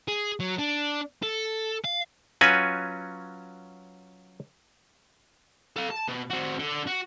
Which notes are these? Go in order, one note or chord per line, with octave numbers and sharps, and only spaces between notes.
G#4
F#3
D4
A4
F5
F#3 C#4 F4 F#4 B4 G#5
A4 F5
A5
B2
C4 F#4
D3
F#4